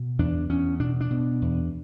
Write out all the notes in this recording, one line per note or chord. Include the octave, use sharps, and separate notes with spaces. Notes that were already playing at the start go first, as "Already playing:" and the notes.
Already playing: B2
E2 D4
E2 C#4
B2 D4
D4
B2
E2